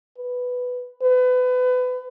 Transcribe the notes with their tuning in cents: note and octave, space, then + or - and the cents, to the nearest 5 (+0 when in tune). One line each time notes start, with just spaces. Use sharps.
B4 +5
B4 +30